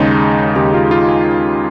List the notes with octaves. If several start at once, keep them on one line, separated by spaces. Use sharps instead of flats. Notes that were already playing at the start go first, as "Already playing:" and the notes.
Already playing: D#2 C#3 G#3 D#4
D#2 C#3 G#3 G4
F4
F4
G#4